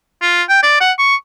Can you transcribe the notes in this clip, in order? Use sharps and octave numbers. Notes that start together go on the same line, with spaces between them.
F4
G5
D5
F#5
C#6